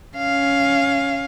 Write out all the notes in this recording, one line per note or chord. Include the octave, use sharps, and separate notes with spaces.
C#4 F5